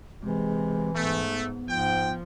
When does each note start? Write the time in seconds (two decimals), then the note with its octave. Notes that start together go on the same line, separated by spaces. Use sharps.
0.22 C3 E3 G#3
0.96 G#2 A3 B3
1.68 G#2 F3 G5